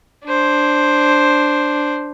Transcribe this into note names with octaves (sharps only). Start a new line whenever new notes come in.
D4 C5